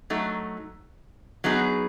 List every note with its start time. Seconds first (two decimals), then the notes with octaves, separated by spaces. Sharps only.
0.10 F#3 A3 D#4
1.44 F#3 B3 D#4 G#4